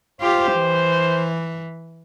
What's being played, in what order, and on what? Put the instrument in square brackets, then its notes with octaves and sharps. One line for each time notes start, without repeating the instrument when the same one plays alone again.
[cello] F4 G4 [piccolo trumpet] C5
[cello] E3